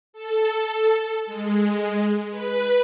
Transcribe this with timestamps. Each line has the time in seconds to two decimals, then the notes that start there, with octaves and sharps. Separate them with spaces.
0.13 A4
1.26 G#3
2.31 B4